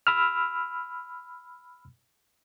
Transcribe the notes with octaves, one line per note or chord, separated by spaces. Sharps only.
B5 E6 F6